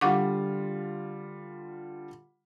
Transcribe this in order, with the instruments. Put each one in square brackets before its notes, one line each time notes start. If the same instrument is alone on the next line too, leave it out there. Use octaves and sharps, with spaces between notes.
[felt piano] D3 G3 F4 [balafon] F#5 C#6 D6